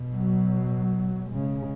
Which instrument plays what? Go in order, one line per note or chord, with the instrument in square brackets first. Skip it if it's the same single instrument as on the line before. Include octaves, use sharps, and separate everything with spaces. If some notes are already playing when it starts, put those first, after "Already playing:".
Already playing: [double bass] B2
[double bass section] F#3
[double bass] C#3 [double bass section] G#3